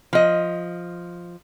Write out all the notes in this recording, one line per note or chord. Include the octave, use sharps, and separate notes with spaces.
F3 D#5